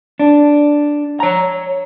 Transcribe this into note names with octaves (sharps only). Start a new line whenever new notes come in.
D4
C#5 A#5